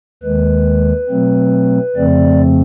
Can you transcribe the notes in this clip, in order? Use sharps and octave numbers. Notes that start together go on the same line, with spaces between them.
D#2 D#3 G#3 B4
B2 F#3 A3 C4
F2 C#3 F3 A3 C4 D5